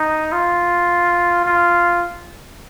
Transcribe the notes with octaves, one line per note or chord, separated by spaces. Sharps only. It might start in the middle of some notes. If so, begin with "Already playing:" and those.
Already playing: D#4
F4
F4